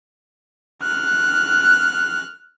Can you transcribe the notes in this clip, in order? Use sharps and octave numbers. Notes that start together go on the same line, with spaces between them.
F6 F#6